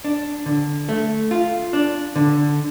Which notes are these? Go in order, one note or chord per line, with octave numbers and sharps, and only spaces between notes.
D4
D3
A3
F4
D4
D3